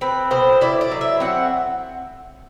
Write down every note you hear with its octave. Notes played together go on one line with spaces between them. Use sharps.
C4 B4
B2 C5
E4 D5
D5
F#3
E5
C4 F#5